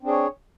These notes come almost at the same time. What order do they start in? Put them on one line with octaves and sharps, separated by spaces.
C4 D4 G#4 C#5